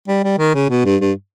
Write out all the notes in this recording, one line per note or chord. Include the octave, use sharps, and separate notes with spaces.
G3
G3
D#3
C#3
B2
G2
G2